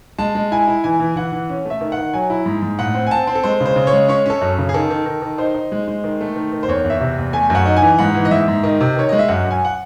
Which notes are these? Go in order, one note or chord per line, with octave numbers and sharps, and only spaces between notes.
G#3 A5
G#3
E4 G#5
E4
E3 G#5
E3
E3 F#5
E3
C#4
A3 E5
D#3
F#5
D#3
F#3 G#5
E4
G#2
G#2
A2 F#5
C4
G#5
C4 A5
C4
A4
G#3 C5
C#3
C5
C#3
C#5
G#3
C#4 C#5
C#4 A4
F#2
C#3
G#4
D#3 A4
D#3
D#3
D#3
D#4 C5
D#4
G#3
G#3
D#3
A3
D#3
D#3
C5
E2 C#5
E2
E5
C3
E2
A3 G#5
F#2 F#5
D#4
G#5
E3
G#2 F#5
E3
D#5
G#2 E5
G#2
D#3 D#5
C3
D#3 C#5
G#3 D#5
E5
F#2 F#5
F#2
G#5
F#5